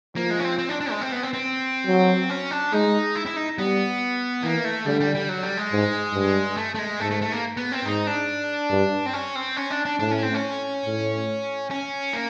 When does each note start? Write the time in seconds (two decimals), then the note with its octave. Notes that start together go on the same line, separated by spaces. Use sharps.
0.16 F3 A#3
0.30 G#3
0.39 C#4
0.44 C4
0.58 C4
0.69 D4
0.80 D4
0.91 G#3
1.01 C4
1.12 B3
1.23 C4
1.34 C4
1.87 F#3
2.30 C#4
2.51 D4
2.73 G#3 D#4
3.15 E4
3.26 E4
3.36 D#4
3.58 G3 B3
4.43 E3 A#3
4.65 A3
4.86 D3 G3
5.00 G3
5.15 G3
5.29 F#3
5.43 G3
5.57 G#3
5.72 G#2
6.14 G2
6.57 A3
6.75 A3
6.79 G#3
7.00 G#2 A3
7.11 A3
7.22 A3
7.32 A#3
7.57 B3
7.72 C4
7.85 G#2 D#4
8.07 D4
8.71 G2
9.06 C4
9.13 C#4
9.35 C4
9.57 C#4
9.70 D4
9.85 D4
9.99 A2 D4
10.11 C#4
10.23 C4
10.34 C#4
10.86 A2
11.71 C#4
12.13 A#3